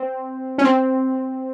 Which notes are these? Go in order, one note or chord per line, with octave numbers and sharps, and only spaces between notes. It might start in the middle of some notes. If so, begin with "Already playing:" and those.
Already playing: C4
C#4
C4